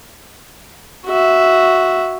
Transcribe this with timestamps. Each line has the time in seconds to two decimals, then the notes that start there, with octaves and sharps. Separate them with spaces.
1.06 F#4 E5